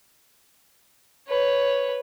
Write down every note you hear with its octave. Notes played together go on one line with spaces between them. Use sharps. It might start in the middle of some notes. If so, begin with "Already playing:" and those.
B4 C#5